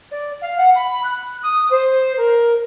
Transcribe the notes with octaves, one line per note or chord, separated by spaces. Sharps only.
D5
F5
F#5
B5
F#6
D#6
C5
A#4